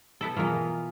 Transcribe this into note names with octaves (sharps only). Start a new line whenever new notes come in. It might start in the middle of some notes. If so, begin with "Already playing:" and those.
B3 E4 A4
B2 E3 F4 G#4 A#4